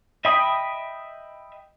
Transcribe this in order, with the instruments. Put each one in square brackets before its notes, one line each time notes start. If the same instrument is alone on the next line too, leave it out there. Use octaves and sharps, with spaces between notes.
[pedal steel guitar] D#5 E5 G5 B5 D#6